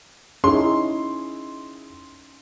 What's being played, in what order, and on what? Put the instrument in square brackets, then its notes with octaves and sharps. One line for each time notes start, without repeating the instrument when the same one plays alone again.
[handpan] C#4 D#4 [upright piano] E4 G#4 [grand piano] C6